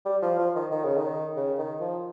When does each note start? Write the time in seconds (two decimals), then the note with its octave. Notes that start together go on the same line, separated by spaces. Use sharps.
0.05 G3
0.22 F3
0.38 F3
0.55 D#3
0.72 D#3
0.85 C#3
0.97 D#3
1.37 C#3
1.58 D#3
1.80 F3